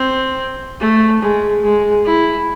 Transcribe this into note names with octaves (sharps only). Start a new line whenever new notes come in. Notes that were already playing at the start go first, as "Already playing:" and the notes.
Already playing: C4
A3
G#3
G#3
E4